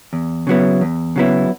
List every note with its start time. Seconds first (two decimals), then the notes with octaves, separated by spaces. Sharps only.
0.13 E2
0.47 C#3 F#3 B3 E4
0.81 E2
1.16 C#3 F#3 B3 E4